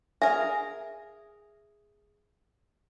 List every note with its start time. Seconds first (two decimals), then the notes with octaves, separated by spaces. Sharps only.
0.22 G#4 A#4 E5